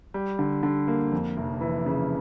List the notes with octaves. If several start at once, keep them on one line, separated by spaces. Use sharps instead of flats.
G3
D3
D3
A#3
F2
F1
E3
C#3